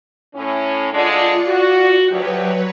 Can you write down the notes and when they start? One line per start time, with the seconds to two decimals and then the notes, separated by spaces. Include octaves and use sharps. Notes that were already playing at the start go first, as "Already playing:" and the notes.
0.35 A2 C#4
0.92 D3 G#3 D4 F4 D5 C#7
1.47 F#4
2.10 D2 F#3 G4 B4 C#5